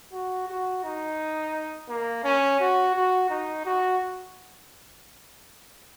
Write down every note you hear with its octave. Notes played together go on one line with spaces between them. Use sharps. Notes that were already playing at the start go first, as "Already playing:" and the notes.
F#4
F#4
D#4
A#3
C#4
F#4
F#4
D#4
F#4